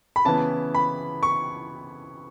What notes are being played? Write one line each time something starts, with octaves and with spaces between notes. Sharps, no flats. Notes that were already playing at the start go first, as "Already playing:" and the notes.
B5
C#3 E3 B3 A5
B5
C#6